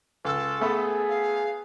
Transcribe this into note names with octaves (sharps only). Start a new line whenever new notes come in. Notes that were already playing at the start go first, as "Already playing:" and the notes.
C#2 A4 E6
A3 B3 G#4 B4
F5